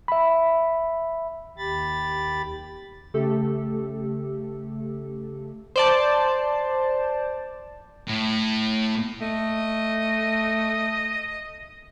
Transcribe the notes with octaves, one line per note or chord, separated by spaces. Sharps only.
E5 B5
D#2 G4 B5 A6
C#3 A3 G4 A4
C5 D5 A5
A2
A3 D#5